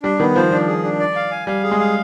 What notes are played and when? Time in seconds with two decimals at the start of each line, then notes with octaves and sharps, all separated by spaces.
0.03 G3 D4
0.20 D#3 B3
0.36 F3 C5
0.51 F3 D4
0.68 G#4
0.84 D4
1.00 D5
1.16 F5
1.31 G#5
1.47 G3 F5
1.64 G#4
1.71 G#3
1.80 F5